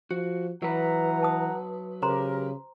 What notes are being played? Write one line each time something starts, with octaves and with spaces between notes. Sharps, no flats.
F3 F#4
E3 F#3 B4 F#5 A#5
A5 D#6
C#3 G4 A#4 C5 A#5 C6